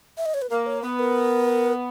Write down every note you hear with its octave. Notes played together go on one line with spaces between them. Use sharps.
E5
D#5
C#5
B4
A#3 A#4
C#5
B3 B4
A#4